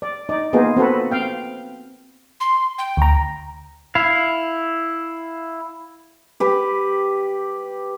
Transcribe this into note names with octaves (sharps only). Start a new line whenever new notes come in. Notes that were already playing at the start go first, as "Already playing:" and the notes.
D5
D#4 D5
A#3 B3 D#4 F4 G#4
C4 F#4 A4 B4
C4 F5 G5
C6
G5
D2 A#5
E4 F5
G4 B4